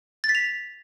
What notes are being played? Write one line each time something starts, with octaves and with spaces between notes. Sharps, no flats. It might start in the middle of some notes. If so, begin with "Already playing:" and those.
A6
B6
F7